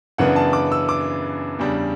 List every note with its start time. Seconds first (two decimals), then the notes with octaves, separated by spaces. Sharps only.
0.18 F#2 C#3 E3 B3 D4 F#5
0.36 A5
0.53 D6
0.72 E6
0.89 D6
1.59 E2 C#3 G3 D4